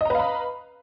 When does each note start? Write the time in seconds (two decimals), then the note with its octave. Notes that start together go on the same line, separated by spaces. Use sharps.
0.01 D#5
0.05 A#5
0.10 B4
0.15 F5
0.19 B5